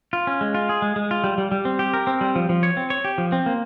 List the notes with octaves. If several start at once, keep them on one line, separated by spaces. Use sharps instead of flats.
F4
C#4
G#3
F4
G#4
G#3
G#3
F4
G3
G3
G3
C4
G4
A#4
C4
G3
F3
F3
C#5
C4
C#5
G4
F3
C4
A#3